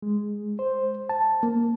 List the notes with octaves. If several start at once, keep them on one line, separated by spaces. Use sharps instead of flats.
G#3
C5
A5
A#3